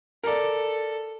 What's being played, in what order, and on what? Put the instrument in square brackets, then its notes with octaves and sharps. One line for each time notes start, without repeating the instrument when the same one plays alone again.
[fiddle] A4 [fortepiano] A#4 D5